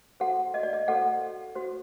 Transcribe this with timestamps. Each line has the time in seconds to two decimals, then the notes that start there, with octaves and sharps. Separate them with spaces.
0.20 F#4 A4 C5 F#5
0.54 D#5
0.63 D5
0.73 D#5
0.88 F#4 A4 C5 F#5
1.55 F#4 C5